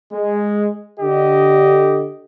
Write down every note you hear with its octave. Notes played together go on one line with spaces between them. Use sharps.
G#3
D3 G4 D#5